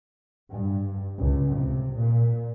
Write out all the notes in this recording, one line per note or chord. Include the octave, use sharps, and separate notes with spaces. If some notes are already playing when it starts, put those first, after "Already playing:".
G2
C#2
C3
A#2